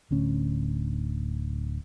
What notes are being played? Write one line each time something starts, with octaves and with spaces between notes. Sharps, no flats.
D1 D2 C#4